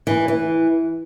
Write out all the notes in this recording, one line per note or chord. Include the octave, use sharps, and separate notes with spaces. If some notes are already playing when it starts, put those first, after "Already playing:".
E3
E3